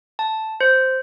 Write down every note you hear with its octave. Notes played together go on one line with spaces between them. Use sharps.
A5
C5